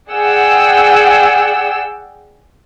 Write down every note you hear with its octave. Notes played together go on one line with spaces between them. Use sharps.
G#4 D5 F#5 G5 E6